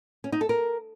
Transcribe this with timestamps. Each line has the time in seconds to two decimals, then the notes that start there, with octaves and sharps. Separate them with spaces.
0.24 C#4
0.32 D#4
0.41 A4
0.49 A#4